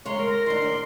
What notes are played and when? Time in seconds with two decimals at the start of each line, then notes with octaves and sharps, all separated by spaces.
0.06 C#3 G#3 C#5 A#5 C6
0.19 A#4 A#5
0.30 A#6
0.46 D#3 D4 C6
0.62 D5